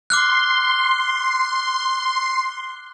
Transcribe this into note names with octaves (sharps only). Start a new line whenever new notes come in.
C6 D6 F6 F#6